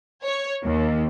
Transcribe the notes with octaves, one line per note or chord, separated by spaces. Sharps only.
C#5
D#2